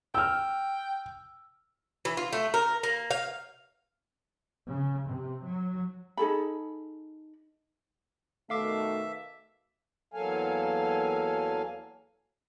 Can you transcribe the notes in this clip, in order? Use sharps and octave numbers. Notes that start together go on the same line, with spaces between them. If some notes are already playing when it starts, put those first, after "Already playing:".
G5 E6 F6
E3
F4
A3
A#4
A#3
F5
C#3
C3
F#3
D#4 G#4 A4 B5
B2 D#3 A3 E5 F5 D6
E2 F#3 A#3 A4 F5 G#5